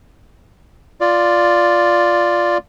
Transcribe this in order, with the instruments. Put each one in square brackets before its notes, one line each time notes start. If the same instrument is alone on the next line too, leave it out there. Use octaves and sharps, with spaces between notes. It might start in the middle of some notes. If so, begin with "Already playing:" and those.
[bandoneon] F4 D5